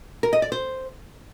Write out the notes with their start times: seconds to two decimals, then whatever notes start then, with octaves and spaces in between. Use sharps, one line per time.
0.23 A#4
0.33 D#5
0.42 D5
0.52 C5